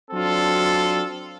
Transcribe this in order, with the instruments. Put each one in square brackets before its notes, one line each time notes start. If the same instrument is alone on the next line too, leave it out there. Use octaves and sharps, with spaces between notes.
[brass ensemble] F#3 C4 D4 F4 A4